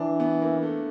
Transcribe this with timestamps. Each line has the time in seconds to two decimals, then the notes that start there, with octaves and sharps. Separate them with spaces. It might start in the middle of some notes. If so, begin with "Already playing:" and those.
Already playing: E3 D4
0.20 B3
0.42 A#3
0.63 A3